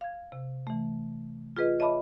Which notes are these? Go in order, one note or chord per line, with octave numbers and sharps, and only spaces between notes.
F5 G#6
C3
E3 A3
F4 G#4 B4 D#5
C#5 D#5 E5 A5 B5 D6